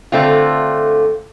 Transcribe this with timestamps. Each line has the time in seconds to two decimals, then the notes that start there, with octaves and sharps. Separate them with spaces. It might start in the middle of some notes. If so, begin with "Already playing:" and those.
0.12 D3 A3 C4 F4